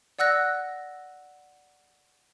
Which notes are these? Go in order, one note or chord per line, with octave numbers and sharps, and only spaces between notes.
D5 F#5 E6 F#6 A#6